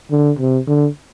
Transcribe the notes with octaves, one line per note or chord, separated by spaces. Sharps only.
D3
C3
D3